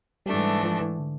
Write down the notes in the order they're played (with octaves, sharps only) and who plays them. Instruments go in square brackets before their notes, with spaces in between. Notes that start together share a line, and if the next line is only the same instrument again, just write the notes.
[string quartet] G#2 E3 A3 D4 [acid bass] G3
[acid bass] F3
E3
D3